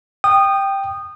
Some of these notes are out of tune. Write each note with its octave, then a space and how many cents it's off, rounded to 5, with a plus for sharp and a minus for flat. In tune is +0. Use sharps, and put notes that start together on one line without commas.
G5 +0 D#6 -20